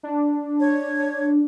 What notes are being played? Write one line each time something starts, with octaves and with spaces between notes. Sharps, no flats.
D4
C#5